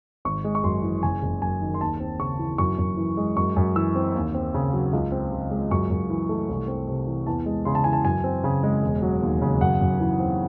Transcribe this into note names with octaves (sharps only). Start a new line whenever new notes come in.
G#1 C#6
G#3
C#6
F#2 C6
E3
F#1 G#5
F#1
F#2 G#5
D#3
C6
D#2 A5
C4
C#3 C#6
E3
F#2 C#6
F#2
E3
G#3
F#2 C#6
F#2
E3 E6
C4
D#2
C4
C#3
F#3
C#2
C4
C#3
G#3
F#2 C#6
F#2
E3
A3
C2
C4
C3
E3
E2 A5
G#3
C#3 C6
A5
E3 G#5
A5
F#2 G#5
C4
C#3
G#3
E1
F#3
D#2
C#3
F#2 F#5
F#2
E3
C4